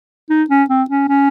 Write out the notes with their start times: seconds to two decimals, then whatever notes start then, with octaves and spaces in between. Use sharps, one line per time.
0.30 D#4
0.50 C#4
0.69 C4
0.90 C#4
1.09 C#4